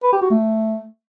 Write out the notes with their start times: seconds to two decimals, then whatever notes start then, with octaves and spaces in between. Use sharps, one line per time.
0.03 B4
0.12 G4
0.21 F#4
0.31 A3